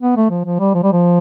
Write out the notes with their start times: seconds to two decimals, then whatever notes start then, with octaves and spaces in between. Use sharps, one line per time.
0.02 B3
0.17 A3
0.30 F3
0.45 F3
0.60 G3
0.74 F3
0.83 G3
0.93 F3